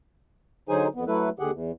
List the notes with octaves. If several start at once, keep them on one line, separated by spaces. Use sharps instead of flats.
D3 F#3 D#4 G#4 C5 G#5
F2 B3
F#3 A3 E4 A4 B4
D#2 D3 G4 G#4 F#5
E2